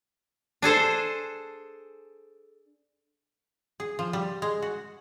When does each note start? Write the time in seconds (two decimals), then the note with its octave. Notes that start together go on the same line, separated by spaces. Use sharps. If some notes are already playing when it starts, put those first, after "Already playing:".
0.62 D4 G#4 A4 C5
3.80 G#4
3.99 F3
4.13 G3
4.42 G#3
4.62 F#4